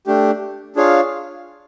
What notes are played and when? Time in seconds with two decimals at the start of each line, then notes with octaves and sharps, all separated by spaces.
0.07 A3 D4 G4
0.76 D4 F4 G#4 C#5 F5